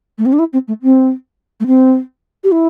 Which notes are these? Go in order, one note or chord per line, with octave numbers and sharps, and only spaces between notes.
A3
C4
D4
E4
C4
A3
C4
A3
C4
G4
E4